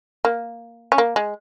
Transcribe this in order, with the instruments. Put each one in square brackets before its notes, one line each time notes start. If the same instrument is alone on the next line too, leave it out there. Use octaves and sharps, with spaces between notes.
[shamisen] A#3
C#4
A#3
G#3